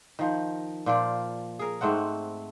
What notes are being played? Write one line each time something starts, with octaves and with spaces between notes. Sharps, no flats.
D#3 F3
A#2 F3 F4 D5
G#4 A#4
G#2 A3 C4 F#5